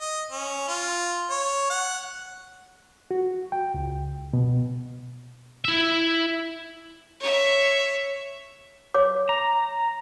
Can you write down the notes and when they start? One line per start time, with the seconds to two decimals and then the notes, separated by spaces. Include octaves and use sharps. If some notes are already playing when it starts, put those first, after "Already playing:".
0.02 D#5
0.32 C#4
0.68 F4
1.31 C#5
1.70 F#5
3.11 F#4
3.52 G5
3.74 C#2
4.33 B2
5.65 E4 E5
7.20 C#5 E5
8.94 C#5 D6
9.29 A#5